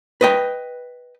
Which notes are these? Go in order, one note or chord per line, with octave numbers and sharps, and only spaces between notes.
B4 D#5 G5